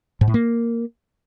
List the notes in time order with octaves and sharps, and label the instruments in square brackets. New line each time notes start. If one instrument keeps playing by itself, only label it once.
[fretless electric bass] G#2
A2
A#3